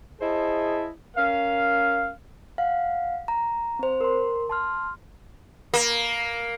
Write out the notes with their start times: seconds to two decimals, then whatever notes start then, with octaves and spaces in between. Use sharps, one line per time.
0.20 E4 G#4 C5 D#5 A5
1.16 C#4 A#4 F5
2.58 F5 F#5
3.28 A#5
3.79 C4 C5
4.01 A#4 C6
4.50 A5 C6 F6
5.74 A#3